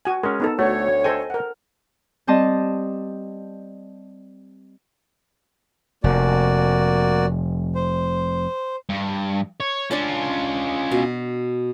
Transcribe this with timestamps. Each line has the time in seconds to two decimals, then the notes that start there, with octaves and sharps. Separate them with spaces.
0.05 F#4 G#5
0.23 G#3 C#4 A#4
0.40 B3 D#4 A4
0.59 D2 A3 F#4 C#5
1.04 A4 C5 D#5 G5 G#5
1.30 A#4 F#5
2.27 G3 C4 D#5 A5
6.04 F1 A#3 F#4 D5
7.75 C5
8.89 G2
9.60 C#5
9.91 C#4 D4 F4 D5 A5
10.91 B2